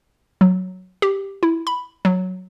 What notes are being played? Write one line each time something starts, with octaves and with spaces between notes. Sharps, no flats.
F#3
G4
E4
B5
F#3